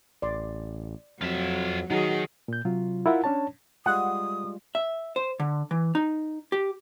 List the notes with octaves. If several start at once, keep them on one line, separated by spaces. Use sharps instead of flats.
A1 D5 C6
F2 F#3 F4 E5
D#3 F#3 D#4 F#4 G#4 A#5
A#2 G6
C3 F#3 F4
E4 F4 A#4 E5 F#5
C#4 D4 C#5 A5
G3 G#3 F4 F#5 D#6
E5
C5
D3
E3
D#4
G4